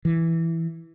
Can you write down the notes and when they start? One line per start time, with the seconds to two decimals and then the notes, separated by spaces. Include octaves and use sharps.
0.05 E3